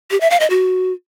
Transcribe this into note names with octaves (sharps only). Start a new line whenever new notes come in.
G4
E5
F5
D#5
F#4